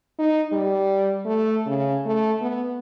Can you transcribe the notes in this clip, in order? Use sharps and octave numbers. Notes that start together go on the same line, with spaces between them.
D#4
G3
A3
C#3
A3
B3